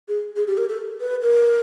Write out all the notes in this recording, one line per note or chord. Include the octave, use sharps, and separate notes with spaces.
G#4
G#4
G4
A#4
A4
B4
A#4